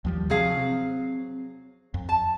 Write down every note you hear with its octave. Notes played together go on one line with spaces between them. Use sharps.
D#2 F3 G3
C3 F3 F#3 G#4 F5
C4
F2
A5